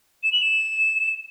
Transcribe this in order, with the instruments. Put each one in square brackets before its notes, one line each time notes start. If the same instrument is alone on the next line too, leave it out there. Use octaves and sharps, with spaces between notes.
[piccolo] E7
F#7
E7